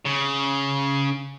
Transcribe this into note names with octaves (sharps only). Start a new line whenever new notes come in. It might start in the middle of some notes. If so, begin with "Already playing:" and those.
C#3